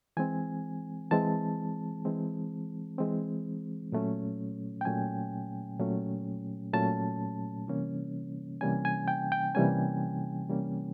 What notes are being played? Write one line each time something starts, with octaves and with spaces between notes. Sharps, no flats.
E3 G#3 C4 G#5
E3 G#3 C4 A5
E3 G#3 C4
E3 G#3 C4
A#2 F#3 A3 C#4
G5
A#2 F#3 A3 C#4 G#5
A#2 F#3 A3 C#4
A#2 F#3 A3 C#4 A5
C3 E3 G3 A#3 C#4
C3 E3 G3 A#3 C#4 G#5
G#5
G5
G5
C3 E3 G3 A#3 C#4 G#5
C3 E3 G3 A#3 C#4